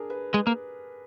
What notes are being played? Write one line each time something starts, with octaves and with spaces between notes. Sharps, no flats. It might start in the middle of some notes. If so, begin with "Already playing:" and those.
Already playing: D4 G#4 A#4
B4
G#3
A#3